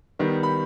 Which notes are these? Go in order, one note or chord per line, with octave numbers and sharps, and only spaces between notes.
D#3 G3 B3
B5